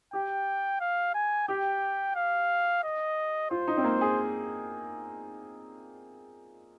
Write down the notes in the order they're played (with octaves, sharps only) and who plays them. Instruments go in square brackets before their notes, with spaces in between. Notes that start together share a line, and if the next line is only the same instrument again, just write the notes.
[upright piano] G4 [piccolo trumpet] G5
[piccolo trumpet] F5
G#5
[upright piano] G4 [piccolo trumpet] G5
[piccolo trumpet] F5
D#5
[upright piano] F4 [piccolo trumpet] C5
[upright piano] D#4
C4
A#3
G#4